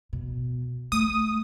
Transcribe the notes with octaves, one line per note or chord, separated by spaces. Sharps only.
B2
A3 D#6